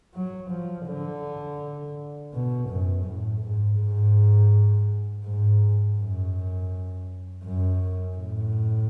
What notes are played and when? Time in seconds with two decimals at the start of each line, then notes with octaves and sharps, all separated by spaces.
0.14 F#3
0.51 F3
0.87 D3
2.34 B2
2.69 F#2
3.06 A2
3.42 G#2
3.79 G#2
5.25 G#2
5.98 F#2
7.44 F#2
8.17 A2